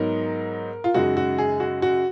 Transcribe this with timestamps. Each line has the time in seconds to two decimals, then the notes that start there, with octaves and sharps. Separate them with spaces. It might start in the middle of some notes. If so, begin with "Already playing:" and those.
Already playing: G#2 F#3 B3 D#4 A#4
0.84 F4
0.94 F#2 C#3 G#3 D#4 F#4
1.17 F#4
1.38 G#4
1.60 F#4
1.82 F#4